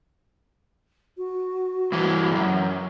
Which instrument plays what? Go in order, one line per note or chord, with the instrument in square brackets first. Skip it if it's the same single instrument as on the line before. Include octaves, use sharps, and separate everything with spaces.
[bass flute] F#4
[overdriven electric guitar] G2 E3
C#2 F#2